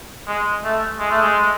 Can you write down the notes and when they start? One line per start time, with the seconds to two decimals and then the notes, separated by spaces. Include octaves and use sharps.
0.27 G#3
0.64 A3
0.99 G#3
1.11 A3
1.22 G#3